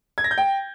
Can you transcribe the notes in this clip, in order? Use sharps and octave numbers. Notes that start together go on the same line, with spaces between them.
G#6
A#6
G6
G5